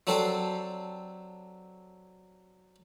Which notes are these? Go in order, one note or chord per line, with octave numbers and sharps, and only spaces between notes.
F#3 C4 D4 G4 A4 C5